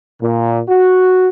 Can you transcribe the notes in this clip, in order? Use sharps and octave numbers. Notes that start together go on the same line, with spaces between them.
A#2
F#4